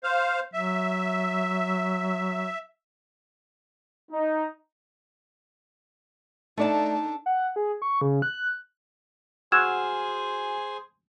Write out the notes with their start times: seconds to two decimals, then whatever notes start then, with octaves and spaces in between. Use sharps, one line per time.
0.03 C5 F5
0.53 F#3 E5
4.12 D#4
6.57 A3 D4 D#4 A4 D5 A5
7.26 F#5
7.56 G#4
7.82 C#6
8.01 C#3
8.22 F#6
9.52 F#4 G#4 C5 G#5 E6 F6 G#6 E7